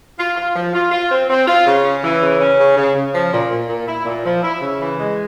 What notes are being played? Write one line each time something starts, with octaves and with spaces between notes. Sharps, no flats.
F4
F4
F3
F4
F4
C4
C4
F4
C#3
C#4
E3
C#3
C#4
C#3
C#3
C#3
F3
A#2
A#2
A#2
E4
A#2
F3
E4
C#3
E3
G#3